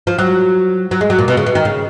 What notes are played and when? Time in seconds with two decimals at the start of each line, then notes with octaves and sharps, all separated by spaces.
0.07 F3
0.19 F#3
0.91 F#3
1.01 G#3
1.10 F#3
1.19 A#2
1.28 B2
1.37 C#3
1.46 B2
1.55 D#3
1.65 C#3